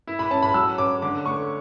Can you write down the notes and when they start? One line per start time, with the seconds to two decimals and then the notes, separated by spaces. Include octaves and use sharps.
0.07 E4
0.19 B5
0.31 C#4 A5
0.43 B5
0.54 F#3 E6
0.78 C#4 D6
1.02 D3 D6
1.26 A3 C#6